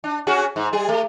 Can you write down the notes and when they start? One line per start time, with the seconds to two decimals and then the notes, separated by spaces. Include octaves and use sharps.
0.04 D4
0.27 C#4 F#4 G#4
0.56 G#2
0.73 G3 G#4
0.89 A3